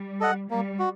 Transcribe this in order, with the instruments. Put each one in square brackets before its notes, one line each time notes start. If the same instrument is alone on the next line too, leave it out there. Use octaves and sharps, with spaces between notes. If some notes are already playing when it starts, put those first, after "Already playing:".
Already playing: [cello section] G3
[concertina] A4 D#5 F#5
[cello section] G3 [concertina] A#3
[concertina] F#4